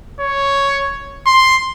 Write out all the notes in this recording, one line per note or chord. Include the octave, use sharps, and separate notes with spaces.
C#5
C6